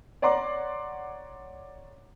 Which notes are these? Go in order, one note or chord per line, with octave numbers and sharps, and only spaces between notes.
C#5 D5 F#5 A#5 C6 D6